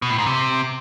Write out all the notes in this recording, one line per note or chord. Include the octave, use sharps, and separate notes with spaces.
B2
A2
G#2
C3